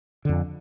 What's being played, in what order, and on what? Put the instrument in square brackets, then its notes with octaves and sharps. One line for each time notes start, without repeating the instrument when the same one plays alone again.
[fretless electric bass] F2 D3